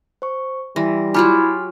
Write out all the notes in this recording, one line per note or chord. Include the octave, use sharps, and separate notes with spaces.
C5 C#6
E3 G3 C6 A#6
F#3 E4 F4 G4 G#5 C6 F6